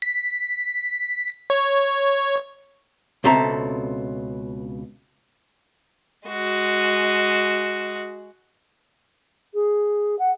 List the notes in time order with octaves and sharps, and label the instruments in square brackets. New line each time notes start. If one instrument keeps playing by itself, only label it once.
[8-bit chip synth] B6
C#5
[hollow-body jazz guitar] C#2 B2 C4 A4 E5 A#5
[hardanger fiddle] G#3 F#4
[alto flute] G#4
F#5